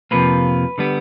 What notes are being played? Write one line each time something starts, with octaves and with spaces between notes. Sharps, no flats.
F2 C3 F3 A#3 B4
D3 G3 B3